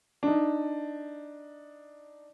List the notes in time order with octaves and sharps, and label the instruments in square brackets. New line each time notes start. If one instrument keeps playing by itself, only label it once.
[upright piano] D4 D#4